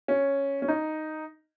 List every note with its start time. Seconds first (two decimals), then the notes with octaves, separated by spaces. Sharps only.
0.08 C#4
0.62 C#4
0.68 D#4